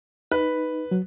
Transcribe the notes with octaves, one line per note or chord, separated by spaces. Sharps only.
D#4 B4
F#3